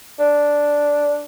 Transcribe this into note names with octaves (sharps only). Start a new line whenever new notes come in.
D4